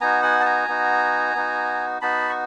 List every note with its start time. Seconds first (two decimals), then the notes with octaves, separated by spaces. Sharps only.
0.01 B3 D#4 F#4 G#5 A#5
0.22 F#5 G#5
0.40 A5
0.45 G#5 A#5
0.68 B3 D#4 F#4
1.35 B3 D#4 F#4
2.01 B3 D#4 F#4 A5 B5
2.29 C#6